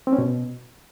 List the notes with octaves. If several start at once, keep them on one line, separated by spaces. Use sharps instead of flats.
C4
C#4
B2